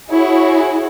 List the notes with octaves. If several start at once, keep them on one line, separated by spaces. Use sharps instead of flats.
E4 F#4 G#4 C#5